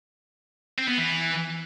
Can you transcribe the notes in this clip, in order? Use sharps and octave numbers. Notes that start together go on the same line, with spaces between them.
C4
B3
E3